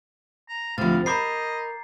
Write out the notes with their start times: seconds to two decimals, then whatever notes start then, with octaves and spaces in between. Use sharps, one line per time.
0.49 A#5
0.78 D2 A2 C3 F3 F5 A6
1.06 A#4 D#5 A#5 B5 D6 G6 C7